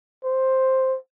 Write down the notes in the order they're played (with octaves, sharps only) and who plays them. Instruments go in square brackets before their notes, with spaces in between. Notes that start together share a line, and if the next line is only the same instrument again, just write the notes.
[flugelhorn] C5